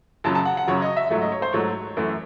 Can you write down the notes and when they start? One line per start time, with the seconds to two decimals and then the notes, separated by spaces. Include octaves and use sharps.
0.24 F#2 C#3 F#3 A5
0.35 A5
0.45 F#5
0.57 F#5
0.67 F#2 C#3 F#3 C#5
0.82 D#5
0.97 E5
1.10 G#2 F#3 A3 E5
1.22 D#5
1.32 C#5
1.42 C5
1.53 G#2 F#3 A3 C#5
1.97 F#2 E3 A3